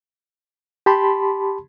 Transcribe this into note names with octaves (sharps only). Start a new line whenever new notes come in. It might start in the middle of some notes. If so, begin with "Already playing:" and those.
G4 A5 B5 C6